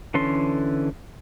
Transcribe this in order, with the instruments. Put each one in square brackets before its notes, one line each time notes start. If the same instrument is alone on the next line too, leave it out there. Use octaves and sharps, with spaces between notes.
[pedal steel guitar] D3 E3 C#4 A4 C6